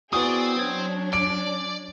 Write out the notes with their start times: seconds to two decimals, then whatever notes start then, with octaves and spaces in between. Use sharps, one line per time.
0.13 B3 C4 E4 F#4 G#4 D5 D#6
0.59 F#3 C#4 D4 G#6
1.13 D5 D7